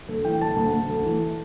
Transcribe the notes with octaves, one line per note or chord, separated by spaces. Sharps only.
D2 A4
E3 G5
D2 A5
D2
D2
D2
E3